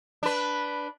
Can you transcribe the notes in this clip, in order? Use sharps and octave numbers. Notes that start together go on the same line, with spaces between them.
D4 B4